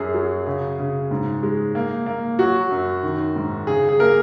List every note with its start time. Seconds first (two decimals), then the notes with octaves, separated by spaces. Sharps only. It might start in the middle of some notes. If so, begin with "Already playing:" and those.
Already playing: F#2 G#4
0.14 F#3
0.46 C#3
0.79 C#3
1.11 G#2
1.43 G#3
1.75 A#3
2.06 A#3
2.39 F#3 F#4
2.71 F#2
3.03 D#3
3.36 G#2
3.67 C#3 G#4
3.89 G#4
3.99 A#3 A#4